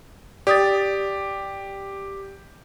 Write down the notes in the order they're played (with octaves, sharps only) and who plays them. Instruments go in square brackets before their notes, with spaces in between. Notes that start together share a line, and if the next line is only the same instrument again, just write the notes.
[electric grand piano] G4 [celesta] D5 D#6 A6